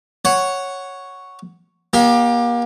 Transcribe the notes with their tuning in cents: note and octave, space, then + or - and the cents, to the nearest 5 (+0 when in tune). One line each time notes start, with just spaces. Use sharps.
C#5 +0 F#5 +0
A#3 +35 G4 +15